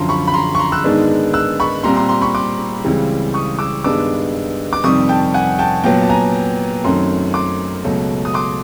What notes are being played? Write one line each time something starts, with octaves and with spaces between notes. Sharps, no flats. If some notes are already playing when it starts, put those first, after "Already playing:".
Already playing: F#2 D3 F3 A#5 C6
B5 C#6
B5
A#5 C6
C#6
A#5 C6
E6 F#6
G#2 D#3 G#3 B3 D4
E6 F#6
B5 C#6
A#2 G3 C4 A#5 C6
A#5 C6
A#5 C6
B5 C#6
C6 D6
C#2 C#3 E3 G3 C4
C#6 D#6
D6 E6
G2 D#3 G#3 B3 D4 D6 E6
D6
F2 C3 D#3 G3 C4 C#6 D#6
G5 A5
F#5 G#5
G5 A5
A#2 F#3 B3 G5 A5
A5
G#5 A#5
F#2 D#3 F#3 A3 C4 A#5 C6
C6 D6
C#2 B2 F#3 A3
D#6
C6 D6